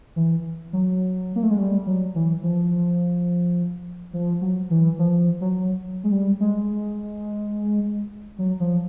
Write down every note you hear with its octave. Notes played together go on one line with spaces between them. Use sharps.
E3
F#3
A#3
A3
G#3
G3
F#3
E3
F3
F3
F#3
E3
F3
F#3
G#3
G3
G#3
F#3
F3